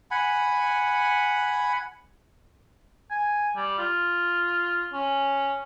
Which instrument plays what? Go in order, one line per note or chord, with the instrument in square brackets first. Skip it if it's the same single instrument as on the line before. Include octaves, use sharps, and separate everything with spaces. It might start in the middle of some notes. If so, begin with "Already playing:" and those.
[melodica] F#5 G#5 B5
[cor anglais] G#5
G3
F4
C#4